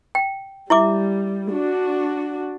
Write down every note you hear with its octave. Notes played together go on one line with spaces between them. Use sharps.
G5
G3 E4 E5 D6
D4 F#4